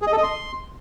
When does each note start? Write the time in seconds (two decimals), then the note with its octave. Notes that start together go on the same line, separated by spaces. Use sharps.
0.02 G#4
0.07 D#5
0.12 A4
0.18 D#5
0.23 C6